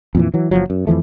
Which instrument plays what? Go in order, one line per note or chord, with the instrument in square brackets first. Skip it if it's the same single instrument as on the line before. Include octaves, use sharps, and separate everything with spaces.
[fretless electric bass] F2 A#2 E3
E3 F#3
F#1 F3 F#3
F#2
F2 E3 F3 A3